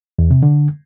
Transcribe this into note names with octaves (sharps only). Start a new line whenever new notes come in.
E2
C3
D3